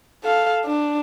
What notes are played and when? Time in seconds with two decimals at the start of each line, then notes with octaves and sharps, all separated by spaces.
0.24 A4 F5
0.65 D4